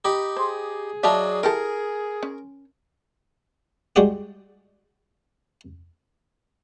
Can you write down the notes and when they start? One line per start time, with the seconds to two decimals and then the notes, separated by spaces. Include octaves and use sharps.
0.05 D#4 G4 B5
0.37 G#4 C5
1.03 F#3 D4 D#4 E5 F5 A5
1.43 E4 G4 A4 A#4
2.23 C#4
3.96 G3 G#3 F#4 G4 D5